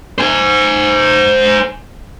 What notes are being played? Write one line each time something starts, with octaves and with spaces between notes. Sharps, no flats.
C5 G#5